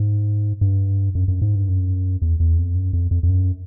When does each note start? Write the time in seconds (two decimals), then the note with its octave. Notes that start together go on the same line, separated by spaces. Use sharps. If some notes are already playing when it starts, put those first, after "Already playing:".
Already playing: G#2
0.61 G2
1.15 F#2
1.28 F#2
1.42 G#2
1.55 G2
1.68 F#2
2.22 E2
2.40 E2
2.58 F2
2.75 F#2
2.93 F2
3.11 F2
3.23 F2
3.29 F#2